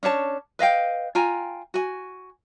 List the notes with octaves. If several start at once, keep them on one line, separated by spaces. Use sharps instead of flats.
C#4 D4 C#5 A5
B4 D#5 F5 G5
F4 G5 G#5 A#5
F#4 G#5